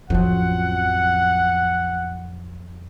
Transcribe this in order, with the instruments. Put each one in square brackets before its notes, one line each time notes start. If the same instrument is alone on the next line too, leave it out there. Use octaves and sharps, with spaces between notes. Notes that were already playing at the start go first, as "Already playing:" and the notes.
[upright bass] A1 C#4 [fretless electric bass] F2 F3 F#3 [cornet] F#5